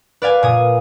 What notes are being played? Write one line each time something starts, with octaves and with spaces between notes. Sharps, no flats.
B4 D5 F5 G#5
A#2 G#5 D#6